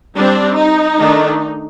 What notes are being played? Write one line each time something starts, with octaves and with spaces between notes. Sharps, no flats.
G3 C4 D4
D#4
D#3 A3 D4